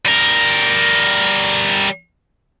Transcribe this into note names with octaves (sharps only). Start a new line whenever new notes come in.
G3 A#4